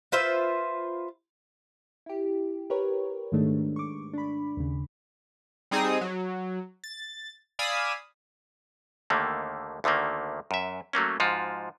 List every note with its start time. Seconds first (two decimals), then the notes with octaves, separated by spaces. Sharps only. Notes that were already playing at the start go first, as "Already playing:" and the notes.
0.12 F4 B4 C5 E5
2.06 E4 G4
2.70 G4 A#4 B4 C#5
3.32 G#2 D#3 G#3 A3 D4
3.76 C#6 D6
4.14 D4 B5
4.57 D#2 C#3
5.71 G3 C4 D#4 G#4 D#6
6.01 F#3
6.84 A6
7.59 D5 F5 G#5 B5 D#6 E6
9.10 D#2 D3 D#3 A3 A#3
9.84 D2 D3 D#3 A3 A#3
10.51 F#2 E5
10.93 F#3 A3 A#3 C#4
11.20 G#2 F3 F4 F#4